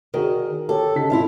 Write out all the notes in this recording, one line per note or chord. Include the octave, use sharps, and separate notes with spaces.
D#3 F#4 G#4 A#4
G4 A4 C#5
C#3 D#4 B6
G#1 G#2 E4 F4 E5